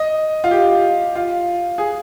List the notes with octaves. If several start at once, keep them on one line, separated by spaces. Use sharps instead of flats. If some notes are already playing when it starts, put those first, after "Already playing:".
Already playing: D#5
F4
G4
F4
G#4